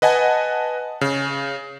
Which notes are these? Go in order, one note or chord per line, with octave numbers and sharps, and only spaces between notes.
B4 D#5 F#5 G#5 A5
C#3